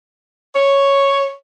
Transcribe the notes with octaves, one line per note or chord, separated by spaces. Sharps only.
C#5